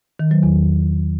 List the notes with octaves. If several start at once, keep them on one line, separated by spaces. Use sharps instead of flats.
D#3
F#3
E2